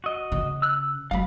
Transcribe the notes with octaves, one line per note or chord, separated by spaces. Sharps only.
F#4 D#5
C#3
E6 F#6
F#3 G#3 F5 B5